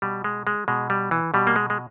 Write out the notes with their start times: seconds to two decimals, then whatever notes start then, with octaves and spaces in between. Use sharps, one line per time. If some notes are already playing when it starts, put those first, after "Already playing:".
0.02 B2 G3
0.24 G#3
0.47 G#3
0.68 B2 G#3
0.90 G3
1.11 E3
1.34 B2 G3
1.47 A#3
1.56 G#3
1.70 G#3